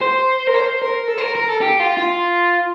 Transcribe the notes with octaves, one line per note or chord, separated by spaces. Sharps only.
C5
A#4
C5
A#4
A4
C5
A#4
A#4
A4
G4
F4
F4